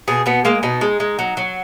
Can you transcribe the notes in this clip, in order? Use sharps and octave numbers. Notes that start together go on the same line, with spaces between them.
B2 G#4
B2 B3
G#3 A#3
B2 D#4
G#3
G#3
F#3
F#3